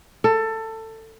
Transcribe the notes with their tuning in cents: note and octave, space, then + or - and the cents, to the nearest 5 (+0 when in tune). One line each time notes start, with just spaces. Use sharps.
A4 +20